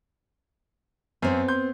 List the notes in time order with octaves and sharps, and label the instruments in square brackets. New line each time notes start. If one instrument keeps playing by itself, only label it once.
[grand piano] F#2 [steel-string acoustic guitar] B3 C4
[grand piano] C6 G6